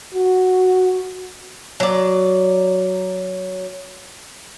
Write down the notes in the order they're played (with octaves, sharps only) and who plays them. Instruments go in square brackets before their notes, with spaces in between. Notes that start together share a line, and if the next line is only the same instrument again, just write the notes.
[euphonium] F#4
[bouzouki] F#3 D5